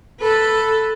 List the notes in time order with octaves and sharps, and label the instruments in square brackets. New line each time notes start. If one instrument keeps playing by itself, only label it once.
[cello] A4 B4